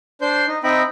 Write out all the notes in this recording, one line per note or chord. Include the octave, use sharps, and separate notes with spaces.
D4 C5 C6 G6
D#4
C4 D#4 D#5 E5 G5 B5